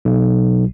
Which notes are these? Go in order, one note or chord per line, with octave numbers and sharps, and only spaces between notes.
B1